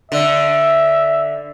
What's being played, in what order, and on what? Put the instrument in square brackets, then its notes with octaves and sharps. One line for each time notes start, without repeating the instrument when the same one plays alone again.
[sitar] D3 [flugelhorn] E5